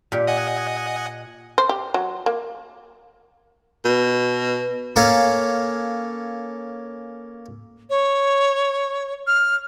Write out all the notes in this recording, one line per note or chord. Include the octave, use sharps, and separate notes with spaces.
A#2 G4
D#5 F#5 G#5
C5
G4
F#3
A#3
B2
A#3 C#4 A4 F5 G#5
C#5
F6